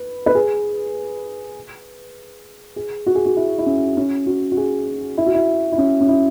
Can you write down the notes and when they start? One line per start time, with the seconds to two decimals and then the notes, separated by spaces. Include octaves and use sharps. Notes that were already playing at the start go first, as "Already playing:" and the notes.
Already playing: B4
0.26 B4
0.35 G#4
2.76 G#4
3.06 F#4
3.15 G#4
3.26 F#4
3.36 E4
3.58 E4
3.66 C#4
3.97 C#4
4.26 F#4
4.52 F#4
4.57 G#4
5.18 E4
5.26 F#4
5.34 E4
5.72 E4
5.78 C#4
6.01 C#4
6.08 E4